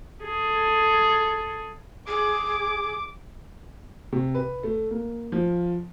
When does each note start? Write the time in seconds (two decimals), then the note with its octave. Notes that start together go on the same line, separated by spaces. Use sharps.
0.23 G#4 A4
2.08 G#4 D6
4.12 C3
4.35 B4
4.63 A3
4.91 A#3
5.32 F3